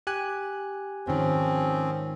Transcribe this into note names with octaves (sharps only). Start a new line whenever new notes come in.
G4 G#5 F#6
G#2 D#3 F3 C4 C#4